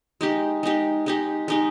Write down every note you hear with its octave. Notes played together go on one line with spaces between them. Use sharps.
G#3 D#4 G4
G#3 D#4 G4
G#3 D#4 G4
G#3 D#4 G4